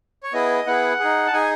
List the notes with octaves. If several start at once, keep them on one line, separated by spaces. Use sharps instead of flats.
C#5
B3 E4 G#4 D#5
B3 E4 G#4 F#5
D#4 G#4
A5
D#4 G#4 G#5